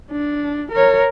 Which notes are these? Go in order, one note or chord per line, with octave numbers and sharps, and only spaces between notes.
D4
A#4 C#5